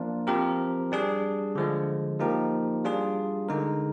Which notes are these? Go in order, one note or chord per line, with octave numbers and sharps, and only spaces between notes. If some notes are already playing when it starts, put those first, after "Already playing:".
Already playing: F3 A#3 D4 F4 A#4
F3 C4 G4 A#4
G3 D4 G#4
D3 F3 G#3
F3 A#3 D#4 G4 A#4
G3 D4 F4 G#4
D3 G#3 D#4 A#4